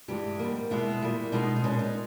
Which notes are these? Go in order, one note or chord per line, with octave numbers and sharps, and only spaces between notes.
G2 E3 G#3 G4
G#2 G3 A#3
E2 B2 G#3 B3 E4
A#2 G3 A#3
B2 G#3 B3 D#4
D#4
A#2 G#3 B3 C#4
D#4